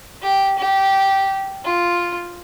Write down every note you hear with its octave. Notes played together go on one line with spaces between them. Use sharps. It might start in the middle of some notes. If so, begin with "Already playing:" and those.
G4
G4
F4